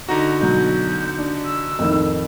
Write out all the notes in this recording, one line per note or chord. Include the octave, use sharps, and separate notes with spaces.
D3 D#4 F#4 A#5
B2 F#3 G6
D4
E6
F2 A2 D#3